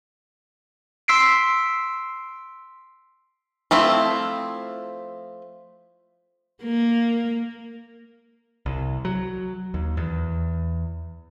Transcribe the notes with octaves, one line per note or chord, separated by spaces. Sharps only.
C6 E6 B6 C7 D7
F3 A3 C4 E4
A#3
C2
F#3
D#2
E2